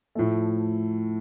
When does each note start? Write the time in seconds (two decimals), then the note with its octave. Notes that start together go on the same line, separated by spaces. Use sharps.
0.15 A2 F3 A3